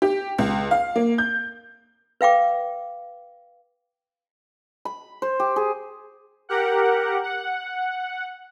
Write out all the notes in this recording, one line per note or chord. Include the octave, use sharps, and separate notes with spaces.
G4
C#2
F5
A#3
G6
B4 F5 G5 D6
B5
C5
G4
G#4
G4 A#4 F#5
F#5